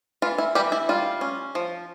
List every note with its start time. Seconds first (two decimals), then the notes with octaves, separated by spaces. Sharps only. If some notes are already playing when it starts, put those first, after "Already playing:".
0.22 E3 F4
0.38 E4
0.55 E3 G3 G4
0.72 E4
0.89 G3 F4
1.21 C#4
1.55 F3